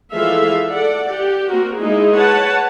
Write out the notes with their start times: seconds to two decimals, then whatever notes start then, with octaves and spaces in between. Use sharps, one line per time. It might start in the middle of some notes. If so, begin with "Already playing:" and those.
0.12 E3 F3 G#3 A4 E5 F5
0.70 A4 D5 F#5
1.12 G4
1.49 A#3 C4 F#4 A#4
1.78 G#3 A#3 D#4 E4 G#4
2.16 B4 C#5 F#5 A5